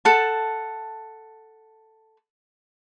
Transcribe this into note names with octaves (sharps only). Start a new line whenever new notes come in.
A4 F#5 A5